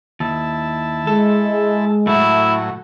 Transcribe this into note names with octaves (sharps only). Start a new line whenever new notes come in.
D#2 E4 A5
G#3 A4
A2 F#3 A3 E4